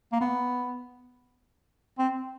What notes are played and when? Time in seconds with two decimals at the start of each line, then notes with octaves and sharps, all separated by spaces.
0.12 A#3
0.20 B3
1.98 C4